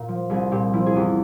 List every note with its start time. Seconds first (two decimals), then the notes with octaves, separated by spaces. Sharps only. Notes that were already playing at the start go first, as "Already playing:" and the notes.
Already playing: A#2 A#4
0.08 F3
0.30 C2 G#4
0.51 A#2 G4
0.73 F3 E4
0.86 G#4
0.95 E2 G4